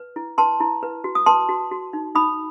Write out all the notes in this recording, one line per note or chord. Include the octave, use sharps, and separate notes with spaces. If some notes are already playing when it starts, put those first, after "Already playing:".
Already playing: B4
E4
B4 A5 C6
E4
B4
F#4
D#6
B4 A5 C6
F#4
F#4
D#4
D#4 B5 D#6